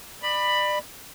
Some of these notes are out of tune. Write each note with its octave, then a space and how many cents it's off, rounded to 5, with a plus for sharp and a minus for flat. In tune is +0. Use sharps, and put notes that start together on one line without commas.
D5 +30 B5 +0